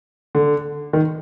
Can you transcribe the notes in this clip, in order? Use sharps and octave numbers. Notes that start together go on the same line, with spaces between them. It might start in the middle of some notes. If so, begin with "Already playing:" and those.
D3
D#3